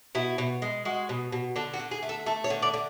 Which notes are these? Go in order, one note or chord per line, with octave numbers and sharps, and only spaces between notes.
B2 E4
B2
G#3
G#3 F#4
B2
B2
D3 A4
F#4
D3
G#4
A3
A4
A3 A4
C#5
D3
D5
D3